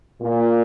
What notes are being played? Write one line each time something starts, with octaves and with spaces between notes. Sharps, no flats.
A#2